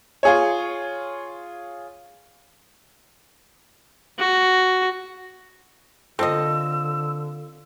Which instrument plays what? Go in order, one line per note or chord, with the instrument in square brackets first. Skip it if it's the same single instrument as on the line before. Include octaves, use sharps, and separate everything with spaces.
[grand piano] F4 G#4 C#5
[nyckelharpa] F#4
[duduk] D3 [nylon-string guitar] A#3 F4 A4 [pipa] C4 D#5 [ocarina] E6